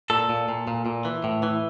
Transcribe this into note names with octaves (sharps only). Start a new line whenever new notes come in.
A#2 A4
A#2
A#2
A#2
A#2
E3
A2
E3